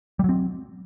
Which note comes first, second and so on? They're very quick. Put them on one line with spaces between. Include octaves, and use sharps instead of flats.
G3 F#3 C4